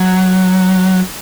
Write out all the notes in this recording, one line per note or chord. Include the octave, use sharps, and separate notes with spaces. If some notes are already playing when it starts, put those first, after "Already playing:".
Already playing: F#3